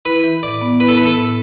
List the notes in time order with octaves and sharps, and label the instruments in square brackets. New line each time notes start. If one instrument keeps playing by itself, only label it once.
[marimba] E4 [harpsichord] B4
[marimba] E3
[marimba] A2 [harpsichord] D5
[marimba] B3
[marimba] E4 [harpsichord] B4
[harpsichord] A4
[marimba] E3 [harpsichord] B4
[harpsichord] A4
[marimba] A2